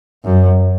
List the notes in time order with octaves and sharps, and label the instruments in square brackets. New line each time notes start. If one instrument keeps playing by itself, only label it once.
[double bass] F#2